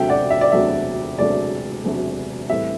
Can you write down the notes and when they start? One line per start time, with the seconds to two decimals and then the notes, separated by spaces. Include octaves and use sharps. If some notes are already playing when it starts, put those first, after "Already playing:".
Already playing: E1 D2 C3 F#3 A3 E5 G5
0.09 D5 F#5
0.30 E5
0.41 D5
0.52 E1 D2 C3 F#3 A3 E5
1.18 E1 D2 C3 F#3 A3 D5
1.84 E1 D2 C3 F#3 A3
2.49 A2 E3 G3 C4 E5